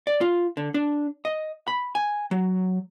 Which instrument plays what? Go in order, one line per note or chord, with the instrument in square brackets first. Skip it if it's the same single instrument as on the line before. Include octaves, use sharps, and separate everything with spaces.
[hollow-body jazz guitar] D5
F4
D3
D4
D#5
B5
G#5
F#3